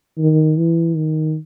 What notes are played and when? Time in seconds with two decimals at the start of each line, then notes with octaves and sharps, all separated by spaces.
0.18 D#3
0.57 E3
0.95 D#3